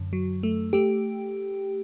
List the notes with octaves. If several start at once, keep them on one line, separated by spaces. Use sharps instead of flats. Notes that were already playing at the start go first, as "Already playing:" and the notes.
Already playing: F#2 D3
F#3
A3
A3 G4